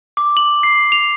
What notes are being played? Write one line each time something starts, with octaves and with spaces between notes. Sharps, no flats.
D6
F#7
C7
F7